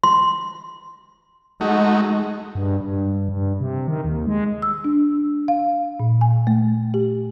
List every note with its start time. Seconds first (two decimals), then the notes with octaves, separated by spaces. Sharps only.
0.04 C6
1.61 G#3 A3 D#4 F#4
2.55 G2
2.80 G2
3.29 G2
3.60 C3
3.88 D#3
4.05 D#2
4.27 G#3
4.62 E6
4.84 D4
5.48 F5
6.00 A#2
6.21 G#5
6.47 A3
6.94 G4